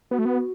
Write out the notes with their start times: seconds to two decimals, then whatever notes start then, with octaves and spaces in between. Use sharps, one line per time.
0.11 B3 F#4
0.19 A3
0.25 B3